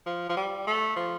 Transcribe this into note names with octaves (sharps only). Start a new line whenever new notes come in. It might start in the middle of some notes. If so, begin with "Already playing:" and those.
F3
F3
G3
A3
F3